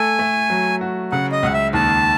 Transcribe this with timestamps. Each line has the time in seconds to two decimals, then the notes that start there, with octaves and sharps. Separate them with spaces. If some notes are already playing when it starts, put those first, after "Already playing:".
Already playing: A3 A4 G#5
0.19 A3
0.50 F#3
0.81 F#4
1.12 C#3 F#5
1.32 D#5
1.43 C#2 F#5
1.53 E5
1.73 D#2 A5